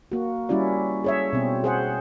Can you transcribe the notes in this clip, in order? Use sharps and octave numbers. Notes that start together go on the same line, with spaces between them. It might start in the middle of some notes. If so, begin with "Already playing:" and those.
A#3 F#4
G3 C#4 E4 F#4 D5
G#4 C#5 E5
B2 C4
G#4 C5 F#5